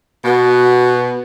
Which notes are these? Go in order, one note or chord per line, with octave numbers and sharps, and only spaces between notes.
B2 B3 F#4